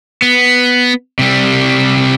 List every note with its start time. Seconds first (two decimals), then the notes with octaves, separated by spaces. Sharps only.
0.22 B3
1.19 C3 G3